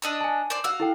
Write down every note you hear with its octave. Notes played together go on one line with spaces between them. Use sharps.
D4 D#5 E6
G#5 A5
C5 D5
F#4 F5 E6
E4 A4 G5